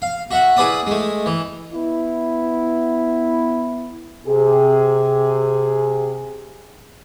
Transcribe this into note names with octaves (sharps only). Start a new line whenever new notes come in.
F5
F#4 E5 F#5
E4 G#4 B4 D5 D#6
G#3 A3
E3
B3 E4
C3 G#4